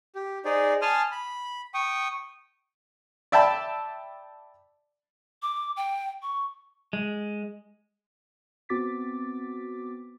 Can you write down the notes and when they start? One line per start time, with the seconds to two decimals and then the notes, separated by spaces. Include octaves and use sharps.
0.15 G4
0.45 D#4 G#4 C5 D5
0.82 G#5 A5 C6 D#6 F6
1.11 B5
1.74 G5 C#6 D#6
3.32 D5 E5 G5 A5 B5
5.42 D6
5.77 G5
6.22 C#6
6.93 G#3
8.69 B3 C4 F#4 D6 A6 B6